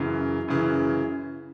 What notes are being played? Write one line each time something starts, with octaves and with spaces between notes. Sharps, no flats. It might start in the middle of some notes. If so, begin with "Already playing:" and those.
Already playing: F#2 C#3 E3
F#2 C#3 E3